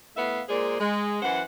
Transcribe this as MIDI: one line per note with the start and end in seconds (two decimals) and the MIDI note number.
0.17 0.41 45
0.17 0.41 59
0.17 0.41 76
0.17 0.41 77
0.49 0.78 46
0.49 0.78 56
0.49 0.78 68
0.49 0.78 70
0.49 0.78 72
0.49 0.78 74
0.80 1.19 56
1.22 1.42 42
1.22 1.42 52
1.22 1.42 72
1.22 1.42 78